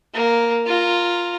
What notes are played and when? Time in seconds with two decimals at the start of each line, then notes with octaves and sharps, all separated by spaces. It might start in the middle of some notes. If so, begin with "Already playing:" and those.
0.14 A#3
0.67 F4 A#5